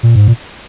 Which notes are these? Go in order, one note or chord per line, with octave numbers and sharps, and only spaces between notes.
A#2
G#2
A#2